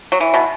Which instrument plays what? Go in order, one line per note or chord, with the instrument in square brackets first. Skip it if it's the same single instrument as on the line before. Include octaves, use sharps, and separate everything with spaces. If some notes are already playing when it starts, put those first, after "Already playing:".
[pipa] F#3
[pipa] E3 [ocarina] E5
[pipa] B2